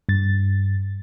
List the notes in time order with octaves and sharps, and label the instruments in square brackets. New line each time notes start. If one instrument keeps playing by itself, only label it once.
[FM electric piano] G2 A6